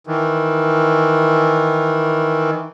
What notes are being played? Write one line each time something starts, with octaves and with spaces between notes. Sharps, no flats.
D#3 E3